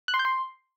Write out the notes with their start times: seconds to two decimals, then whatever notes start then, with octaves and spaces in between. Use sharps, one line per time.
0.08 F#6
0.14 C6
0.19 G6
0.25 C6